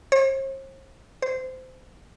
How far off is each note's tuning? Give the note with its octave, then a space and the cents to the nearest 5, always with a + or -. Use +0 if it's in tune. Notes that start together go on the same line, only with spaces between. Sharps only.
C5 +45
C5 -20